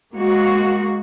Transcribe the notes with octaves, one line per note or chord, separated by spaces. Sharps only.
G#3 A#3 F#4